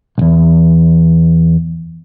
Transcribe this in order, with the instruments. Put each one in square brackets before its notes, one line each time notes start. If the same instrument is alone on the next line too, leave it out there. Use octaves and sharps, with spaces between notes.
[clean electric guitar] B1 E2